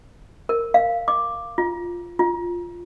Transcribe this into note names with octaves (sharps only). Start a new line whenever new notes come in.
A#4
F5
D6
F4
F4